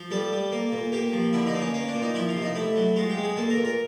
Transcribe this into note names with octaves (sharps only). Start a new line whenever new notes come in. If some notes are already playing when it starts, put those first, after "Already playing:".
Already playing: F3
G3 A4
G3
A#3
A#2
A#3 G4
F3
D3 E4
D#4
A#3
C#4
A#3 C#4
D4
A#2
D#4
F3 E4
F4
C3
D#4
A3 E4
F#3
G#3 F4
G4
G#3
G#4
A#2 A4
A#4
A#2
A#4